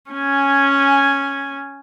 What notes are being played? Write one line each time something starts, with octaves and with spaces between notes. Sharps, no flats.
C#4 G#5